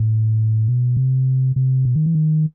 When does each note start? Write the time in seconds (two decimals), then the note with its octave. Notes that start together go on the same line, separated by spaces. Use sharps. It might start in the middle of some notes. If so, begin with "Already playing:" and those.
Already playing: A2
0.68 B2
0.97 C3
1.56 C3
1.85 B2
1.96 D#3
2.06 E3
2.15 D#3